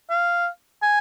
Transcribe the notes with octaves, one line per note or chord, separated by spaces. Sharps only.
F5
G#5